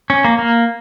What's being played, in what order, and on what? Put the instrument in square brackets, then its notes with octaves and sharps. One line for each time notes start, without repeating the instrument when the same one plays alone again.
[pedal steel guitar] C#4
A#3
A#3